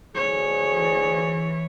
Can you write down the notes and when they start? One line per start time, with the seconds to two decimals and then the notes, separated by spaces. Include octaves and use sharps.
0.16 D2 G#4 C#5
0.72 E3